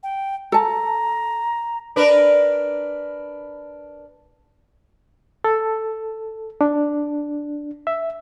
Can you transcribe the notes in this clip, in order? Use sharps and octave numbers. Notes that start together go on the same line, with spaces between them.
G5
A4 A5 A#5
D4 A#4 B4
A4
D4
E5